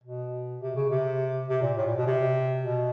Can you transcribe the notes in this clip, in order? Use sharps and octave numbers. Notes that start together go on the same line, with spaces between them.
B2
C3
C#3
C3
C3
A#2
A2
A#2
B2
C3
B2